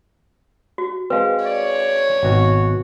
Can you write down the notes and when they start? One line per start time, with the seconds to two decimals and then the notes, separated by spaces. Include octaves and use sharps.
0.78 F#4
1.10 G#3 C4 B4 F5
1.45 C#5 D5
2.23 G#1 B2 F#4